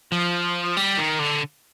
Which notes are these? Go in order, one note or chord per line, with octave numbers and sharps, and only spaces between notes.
F3
G3
D#3
D3